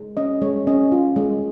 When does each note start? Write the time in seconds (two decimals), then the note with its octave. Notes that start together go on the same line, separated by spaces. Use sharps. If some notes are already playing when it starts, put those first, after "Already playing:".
Already playing: G#3
0.17 C#4 D#5
0.41 G#3 C#5
0.67 C#4 D#5
0.92 F4
1.16 G#3